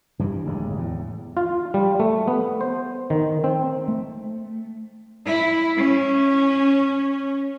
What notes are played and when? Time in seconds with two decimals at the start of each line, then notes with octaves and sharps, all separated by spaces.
0.19 G2 E3 G3
0.46 D1 D#2 G#3
0.76 E2 A2
1.37 F4
1.74 G3
2.00 A3
2.28 B3
2.61 C5
3.10 D#3
3.44 C4
3.88 A3
5.26 E4
5.78 C#4